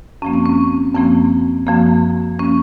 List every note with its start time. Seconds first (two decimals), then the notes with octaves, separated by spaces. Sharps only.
0.22 F#2 F3 A#3 C#4
0.33 C4
0.46 C#4
0.94 F#2 F3 A#3 C4
1.67 F#2 F3 A#3
2.39 F3 A#3 C#4